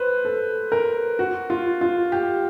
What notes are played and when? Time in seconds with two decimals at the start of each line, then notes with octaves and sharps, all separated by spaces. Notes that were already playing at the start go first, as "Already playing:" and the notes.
Already playing: B4 C5
0.25 A4
0.72 A#4
1.19 F#4
1.50 F4
1.81 F4
2.12 G4